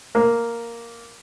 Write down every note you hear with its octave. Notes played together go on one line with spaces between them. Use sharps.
A#3